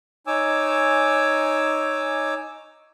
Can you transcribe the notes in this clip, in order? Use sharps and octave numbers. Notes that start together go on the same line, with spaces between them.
D#4 C#5 G#5 D6 E6